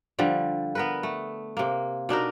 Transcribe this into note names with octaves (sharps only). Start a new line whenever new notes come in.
D3 F3 G3
B3 A#4 B4
A3
C3 A#3
B2 D4 D#4 A#4